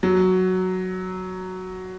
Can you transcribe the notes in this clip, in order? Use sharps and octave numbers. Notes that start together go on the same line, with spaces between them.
F#3